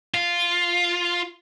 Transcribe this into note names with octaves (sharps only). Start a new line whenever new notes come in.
F4